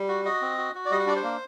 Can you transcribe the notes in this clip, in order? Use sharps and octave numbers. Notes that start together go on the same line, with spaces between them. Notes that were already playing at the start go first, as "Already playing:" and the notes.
Already playing: G3
F#4
F#4 D#5
C4
F#4
F#4
D5
G3 D#5
F#5
D4 D5
C5
A#3